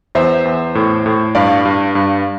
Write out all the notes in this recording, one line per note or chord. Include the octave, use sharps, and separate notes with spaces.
E2 C5 E5
E2
A2
A2
G2 D5 F5
G2
G2